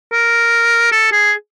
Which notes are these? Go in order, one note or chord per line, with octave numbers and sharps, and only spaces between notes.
A#4
A4
G#4